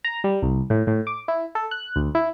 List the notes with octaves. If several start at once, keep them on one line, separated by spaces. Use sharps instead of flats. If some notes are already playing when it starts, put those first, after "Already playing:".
A#5
G3
C2
A2
A2
D6
E4
A4
F#6
D2
E4